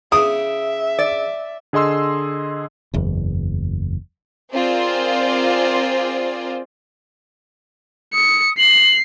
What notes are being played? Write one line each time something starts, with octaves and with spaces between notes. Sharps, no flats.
C#3 E4 E5 D6 D#6
D5
D3 G#4 D#5 C6 E6
F#1 E2
C4 F4 G#4 A#4 C5 D5
D#6 C#7
C7 F#7